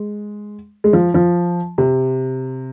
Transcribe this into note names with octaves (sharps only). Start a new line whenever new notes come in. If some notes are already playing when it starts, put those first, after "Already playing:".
Already playing: G#3
G#3
F3
F3
C3